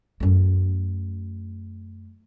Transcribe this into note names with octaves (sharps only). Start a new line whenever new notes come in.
F#2 A3